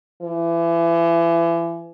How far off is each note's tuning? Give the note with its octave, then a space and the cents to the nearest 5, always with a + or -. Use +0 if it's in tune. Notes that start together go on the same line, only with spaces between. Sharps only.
E3 +35